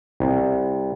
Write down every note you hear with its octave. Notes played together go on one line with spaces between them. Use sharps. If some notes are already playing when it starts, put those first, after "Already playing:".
C2